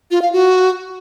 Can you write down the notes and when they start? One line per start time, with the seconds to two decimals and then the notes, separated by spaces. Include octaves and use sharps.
0.11 F4
0.22 F5
0.33 F#4